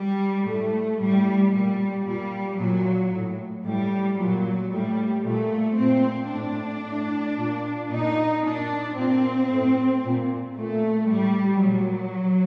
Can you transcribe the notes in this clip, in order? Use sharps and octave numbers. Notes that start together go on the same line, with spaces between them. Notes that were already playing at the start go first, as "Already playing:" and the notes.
Already playing: G3
A2 A3
A2 G3
A#2 G3
A#2 G3
A#2 F#3
A2
A2 G3
A#2 F#3
A2 G3
A#2 A3
A#2 C4
A2 D4
A2
A#2
A#2 D#4
A#2 D4
A#2 C4
A2
A#2
A#2 A3
A2 G3
A#2 F#3